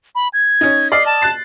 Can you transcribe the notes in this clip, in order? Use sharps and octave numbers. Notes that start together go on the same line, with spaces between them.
B5
G#6
C#4 D#4
D5 D#5 F6 C7
A5
F#6 A6 C7